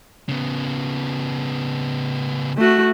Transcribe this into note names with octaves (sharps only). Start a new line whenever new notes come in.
C#3 B3
A3 F#4